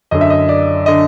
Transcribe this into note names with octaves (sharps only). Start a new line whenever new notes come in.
F#2 D3 D#5
E5
D#5
D5
D3 D#5